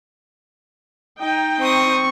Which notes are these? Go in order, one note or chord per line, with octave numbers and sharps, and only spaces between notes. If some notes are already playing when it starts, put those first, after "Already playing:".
D#4 G5
C4 C5 C#6 D#6